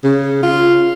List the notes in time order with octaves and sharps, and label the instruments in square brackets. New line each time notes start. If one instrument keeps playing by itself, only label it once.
[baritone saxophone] C#3
F4